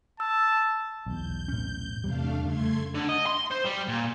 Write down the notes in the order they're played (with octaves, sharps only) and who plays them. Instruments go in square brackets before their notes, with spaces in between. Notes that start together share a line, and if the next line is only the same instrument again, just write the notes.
[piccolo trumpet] A5 [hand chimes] E6
[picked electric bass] B1 E2 [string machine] G6
[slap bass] A2 C#4
[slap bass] E2 C3 [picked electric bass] G3 [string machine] A3 D4 F5
[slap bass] F2 C#3 [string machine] A3 C6 G#6
[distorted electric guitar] D3
D#5
C6
C5
G3
A#2